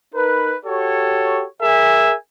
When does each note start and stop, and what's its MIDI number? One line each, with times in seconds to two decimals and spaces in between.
0.15 0.55 63
0.15 0.55 70
0.15 0.55 71
0.66 1.45 66
0.66 1.45 67
0.66 1.45 69
0.66 1.45 73
1.62 2.15 68
1.62 2.15 70
1.62 2.15 76
1.62 2.15 80